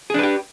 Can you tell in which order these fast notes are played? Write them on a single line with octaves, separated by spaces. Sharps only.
G#4 D4 B4 G4